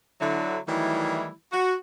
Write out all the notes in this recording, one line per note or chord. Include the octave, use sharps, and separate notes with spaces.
D3 F#3 E4
D#3 E3 F#3 G3 A3 E4
F#4